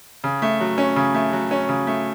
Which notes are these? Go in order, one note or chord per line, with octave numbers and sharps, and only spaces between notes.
C#3
A3
F#3
C#4
C#3
A3
F#3
C#4
C#3
A3